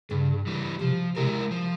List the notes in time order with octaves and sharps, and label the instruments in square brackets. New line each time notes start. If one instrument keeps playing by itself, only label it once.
[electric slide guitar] G2 [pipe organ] C#3
[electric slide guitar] E3 G3
[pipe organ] C3 [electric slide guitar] F3
[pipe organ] C3 [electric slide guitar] G#3 E4 A#4
[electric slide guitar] F3